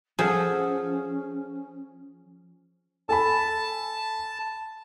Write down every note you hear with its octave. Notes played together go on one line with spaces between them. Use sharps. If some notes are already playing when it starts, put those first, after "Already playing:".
F3 C#4 G#4 A4 F#5
A4 G#5 A5 B5